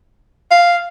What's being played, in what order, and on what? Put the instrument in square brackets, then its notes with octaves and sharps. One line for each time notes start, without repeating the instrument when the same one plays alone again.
[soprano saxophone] F5